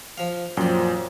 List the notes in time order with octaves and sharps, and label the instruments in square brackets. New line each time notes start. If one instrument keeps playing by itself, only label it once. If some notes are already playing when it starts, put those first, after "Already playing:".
[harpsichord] F3 F5
[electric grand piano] F#2 A#2 [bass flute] F3 [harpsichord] D5 G5